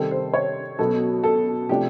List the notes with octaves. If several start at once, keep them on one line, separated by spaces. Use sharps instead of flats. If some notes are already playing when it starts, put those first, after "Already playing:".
Already playing: C3 D#3 G3 C4 A4
C5
C#5
B2 F#3 B3 A4
A4
C3 F3 A3 D4 G4